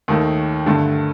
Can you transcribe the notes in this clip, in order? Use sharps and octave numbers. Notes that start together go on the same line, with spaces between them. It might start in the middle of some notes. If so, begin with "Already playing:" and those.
D#2 D#3 A3
G2 D3 A3